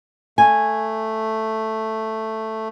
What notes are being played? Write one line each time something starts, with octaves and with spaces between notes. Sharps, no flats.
A3 G#5